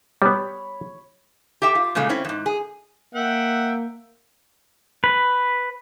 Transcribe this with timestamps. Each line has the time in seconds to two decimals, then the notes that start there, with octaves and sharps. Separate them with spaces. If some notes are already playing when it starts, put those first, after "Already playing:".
0.22 G3 B3 C#5 B5
1.62 G4 A4 E5 G5
1.75 F4
1.95 A#2 C#3 G#3 A3
2.09 C4 C#4 E4
2.25 F2 G#2
2.46 G#4
3.15 A#3 E5 F#5 G5
5.04 B4